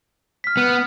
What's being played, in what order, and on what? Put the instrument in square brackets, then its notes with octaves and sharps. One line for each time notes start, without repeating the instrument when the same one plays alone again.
[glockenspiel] F6 B6
[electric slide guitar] B3